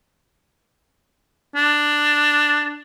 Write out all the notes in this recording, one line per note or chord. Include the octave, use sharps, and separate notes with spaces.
D4